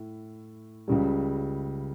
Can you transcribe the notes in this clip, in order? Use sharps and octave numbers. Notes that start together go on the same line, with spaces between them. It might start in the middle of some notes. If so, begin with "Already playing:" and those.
Already playing: A2 E4
C#2 C#3 G3